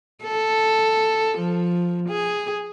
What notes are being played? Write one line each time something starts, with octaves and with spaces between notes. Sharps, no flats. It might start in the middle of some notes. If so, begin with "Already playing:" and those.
A4
F3
G#4